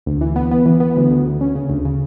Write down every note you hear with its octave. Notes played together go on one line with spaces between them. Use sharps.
D2
E3
B3
B3
E3
B3
D2
D2
D2
C#4
C#3
D2
C#3